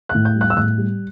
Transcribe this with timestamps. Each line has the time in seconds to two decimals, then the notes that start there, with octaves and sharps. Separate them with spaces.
0.09 F#6
0.15 A2
0.25 G6
0.36 G3
0.41 F#6
0.50 E6
0.56 A2 F#6
0.78 G3